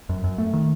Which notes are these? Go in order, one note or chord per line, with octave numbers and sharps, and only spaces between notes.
F#2
F#2
A3
D#3